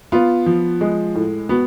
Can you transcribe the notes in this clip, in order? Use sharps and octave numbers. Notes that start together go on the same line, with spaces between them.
B3 F4
F3
G#3
A2
B3 F#4